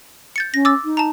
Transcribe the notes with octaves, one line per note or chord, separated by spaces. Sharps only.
G6 A6 C#7
C#4 A#6
D6 E6 A6
D#4
A5 A#5